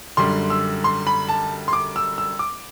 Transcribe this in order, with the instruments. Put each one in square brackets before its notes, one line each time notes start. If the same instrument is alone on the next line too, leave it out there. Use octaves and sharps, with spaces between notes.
[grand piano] F#2 D3 G3 C6
E6
C6
B5
A5
C6
D6
E6
E6
D6